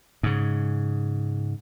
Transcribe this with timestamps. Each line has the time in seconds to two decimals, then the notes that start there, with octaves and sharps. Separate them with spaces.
0.23 G#2 C#3